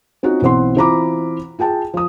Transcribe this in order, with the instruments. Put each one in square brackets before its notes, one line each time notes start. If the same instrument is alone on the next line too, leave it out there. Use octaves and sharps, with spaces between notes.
[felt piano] C4 C#4 D#4 F4 F#4
B1 E3 C4 F#5 C6
E3 C4 F4 A#5 B5 D6
F4 G#4 G5 A5
F3 D#6